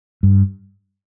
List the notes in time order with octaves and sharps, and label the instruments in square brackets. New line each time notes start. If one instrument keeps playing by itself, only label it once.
[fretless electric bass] G2